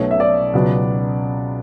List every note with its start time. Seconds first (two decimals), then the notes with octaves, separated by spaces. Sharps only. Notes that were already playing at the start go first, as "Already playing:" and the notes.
Already playing: B1 B2 F#3 A3 C#5
0.11 E5
0.20 D5
0.53 C#2 B2 F#3 B3